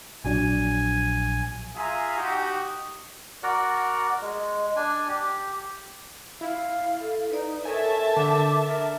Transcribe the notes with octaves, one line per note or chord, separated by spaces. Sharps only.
A#1 F#3 D4 G#5
F4 G#4 E5 G#5 A#5
D#4 F#4 G4
F#4 A#4 D5 F#5
G#3
D4 G#5
G4
E4 F5
A4
D#4 B4 D5
A4 A#4 C#5 E5 G#5 A5
D3 D6
A#4